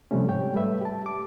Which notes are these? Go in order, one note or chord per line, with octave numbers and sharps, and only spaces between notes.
C3 F3 G3 A3 C#4
G#2 C#5 G5
G3 A3 B4 E5
G4 A5
D6